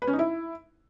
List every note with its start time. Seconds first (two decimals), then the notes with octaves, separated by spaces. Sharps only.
0.02 B4
0.08 C#4
0.13 D#4
0.19 E4